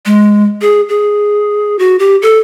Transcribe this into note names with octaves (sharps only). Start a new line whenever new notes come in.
G#3
G#4
G#4
F#4
G4
A4